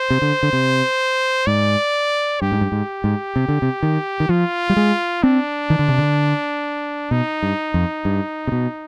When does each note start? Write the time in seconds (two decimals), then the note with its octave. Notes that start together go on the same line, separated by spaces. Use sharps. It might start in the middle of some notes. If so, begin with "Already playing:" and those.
Already playing: C5
0.10 C3
0.22 D3
0.43 D3
0.53 C3
1.47 G#2 D5
2.41 G2 G4
2.52 G#2
2.61 G2
2.72 G#2
3.04 G#2
3.36 C3
3.49 D3
3.62 C3
3.83 D#3
4.20 D#3
4.29 F3 F4
4.70 G3
4.77 G#3
5.23 C4 D4
5.70 D#3
5.79 D3
5.88 C3
5.98 D3
7.11 B2 D#4
7.43 G2
7.74 F2
8.05 G2
8.47 C3
8.52 B2